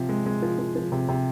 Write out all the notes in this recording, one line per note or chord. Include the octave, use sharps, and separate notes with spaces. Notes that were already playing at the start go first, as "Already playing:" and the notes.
Already playing: C3 F3
G#3
G#3
F3
F3
F3
C3
C3